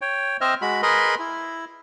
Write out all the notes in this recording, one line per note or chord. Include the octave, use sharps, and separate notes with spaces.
C#5 G5
C4 C5 D#5 E5 F6
G#3 F#4 B5
G#4 A#4 B4 D#5 B5 C6
E4